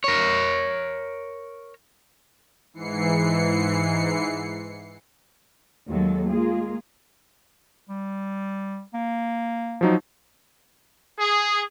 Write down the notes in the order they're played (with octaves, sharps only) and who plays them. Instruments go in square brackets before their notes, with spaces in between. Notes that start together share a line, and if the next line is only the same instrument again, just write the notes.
[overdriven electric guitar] A#4 C#5
[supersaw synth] G#2 E3 C7 C#7
[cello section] D#2 F#3 G#3 A#3 A4
G#3 A#3 F4 G#4
[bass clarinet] G3
A#3
[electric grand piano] F3 F#3 D#4
[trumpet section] G#4